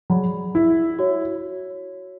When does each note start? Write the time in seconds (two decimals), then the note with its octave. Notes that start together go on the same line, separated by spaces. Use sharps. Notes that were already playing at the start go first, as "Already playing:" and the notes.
0.10 F#3 G#4 D5 F#5 B5
0.55 E4
0.99 F#4 C#5